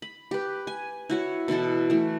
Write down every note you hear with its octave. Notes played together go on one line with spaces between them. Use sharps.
B5
G4 B4
G#5
E4 F#4 C#5
B2 E3 E4 A4
E3 A3